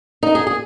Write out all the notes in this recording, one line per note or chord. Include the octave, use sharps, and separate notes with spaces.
D#4
G#4
G#4